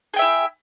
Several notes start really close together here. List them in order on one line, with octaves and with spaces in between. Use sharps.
G#4 G5 E5 E4